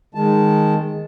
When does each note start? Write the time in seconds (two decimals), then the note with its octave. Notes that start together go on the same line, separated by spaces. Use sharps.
0.15 D#3 G#3 A5